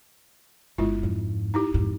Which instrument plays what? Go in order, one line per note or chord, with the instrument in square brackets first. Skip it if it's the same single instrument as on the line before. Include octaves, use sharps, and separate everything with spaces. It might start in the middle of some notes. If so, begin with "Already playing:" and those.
[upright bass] G1 [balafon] G#3 E4 F4
[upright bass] F2 G#2
[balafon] D#4 E4 G4
[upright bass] F2 G#2